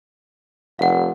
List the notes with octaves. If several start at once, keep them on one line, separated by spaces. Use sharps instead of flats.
F1 F5 F#5